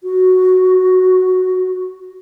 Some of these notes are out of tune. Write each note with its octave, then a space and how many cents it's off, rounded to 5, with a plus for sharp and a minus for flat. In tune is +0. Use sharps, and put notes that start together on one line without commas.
F#4 +0